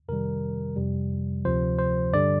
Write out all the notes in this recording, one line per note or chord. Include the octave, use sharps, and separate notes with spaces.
F2 C3 D#3 G3 A#4
F2 C3 G3
D2 C3 F3 C5
C5
G2 D3 G3 D5